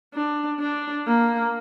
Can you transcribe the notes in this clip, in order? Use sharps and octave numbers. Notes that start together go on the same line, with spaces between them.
D4
D4
A#3